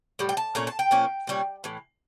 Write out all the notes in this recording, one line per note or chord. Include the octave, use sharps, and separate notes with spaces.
A2 G3
G5
A5
A#2 A3 C#4 A#5
A5
G5
A#2 F3 A#3 C#4
A#2 G3 C#4
A2 E3